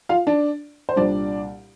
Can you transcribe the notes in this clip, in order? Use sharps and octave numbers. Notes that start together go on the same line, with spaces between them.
F4 F5
D4 D5
C5
C2 A#2 G3 D4 D5